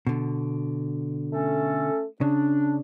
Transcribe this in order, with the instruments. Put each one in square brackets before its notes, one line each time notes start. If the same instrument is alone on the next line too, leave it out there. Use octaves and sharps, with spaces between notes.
[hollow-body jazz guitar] B2 D3
[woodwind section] A3 C#4 A4
[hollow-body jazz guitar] C#3 [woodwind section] D4